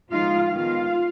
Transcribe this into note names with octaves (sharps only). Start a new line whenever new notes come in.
F3 G#3 D#4 F4 F5
D#3 G#3 B3 F4 F5